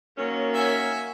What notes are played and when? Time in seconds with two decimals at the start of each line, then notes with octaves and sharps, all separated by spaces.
0.18 D#3 F#3 A#3 C#4
0.54 F#4 E5 G#5